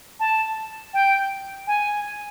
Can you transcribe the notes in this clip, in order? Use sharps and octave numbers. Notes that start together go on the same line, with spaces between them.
A5
G5
G#5